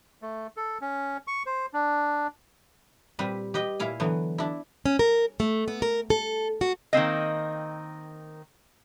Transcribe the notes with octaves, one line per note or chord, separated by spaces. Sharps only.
A3
A4
C#4
C#6
C5
D4
A#2 G3 C4 B4
G4 B4 D#5
A#2 E4 F5 G#5
D3 E3 F#3 B3
D4 E4
C#4
A#4
A3
B3
A#4
A4
F#4
D#3 A#3 C4 D#5